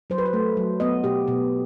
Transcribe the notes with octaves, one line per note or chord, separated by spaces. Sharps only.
F#3 C5
B4
C5
A3
F#3
B3 D#5
B2 G4
B2